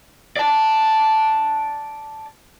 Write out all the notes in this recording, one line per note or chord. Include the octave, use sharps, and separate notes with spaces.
D5 A5